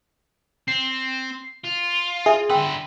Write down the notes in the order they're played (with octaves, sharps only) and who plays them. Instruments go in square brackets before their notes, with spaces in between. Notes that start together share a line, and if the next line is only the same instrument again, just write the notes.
[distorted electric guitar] C4 [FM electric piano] C7
[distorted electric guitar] F4
[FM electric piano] G#4 [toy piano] E5
[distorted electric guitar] D3 B4 [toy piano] G5 C6 E6